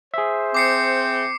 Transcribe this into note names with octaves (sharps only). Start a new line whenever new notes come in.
G#4 C5 E5
C4 D6 C7 C#7